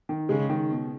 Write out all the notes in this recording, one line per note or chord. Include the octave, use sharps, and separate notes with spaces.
D#3
C#3 G#3
D#3
B2